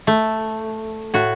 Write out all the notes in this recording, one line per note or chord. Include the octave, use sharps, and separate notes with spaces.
A3
A2 F#4